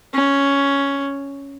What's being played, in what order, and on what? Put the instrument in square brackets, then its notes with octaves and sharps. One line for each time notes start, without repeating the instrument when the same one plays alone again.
[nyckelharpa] C#4